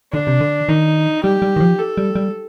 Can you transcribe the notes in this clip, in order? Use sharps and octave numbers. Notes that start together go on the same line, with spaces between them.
D3 D4
C3
D3
D#3 D#4
G3 G4
G3
D#3
F3
A4
G3
G3